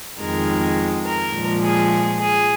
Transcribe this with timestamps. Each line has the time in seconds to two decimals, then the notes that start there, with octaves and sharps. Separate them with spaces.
0.19 F2 D#3 G#3 A#4
1.05 A#4
1.33 A#2 F3 G#3
1.61 G#4
2.18 G#4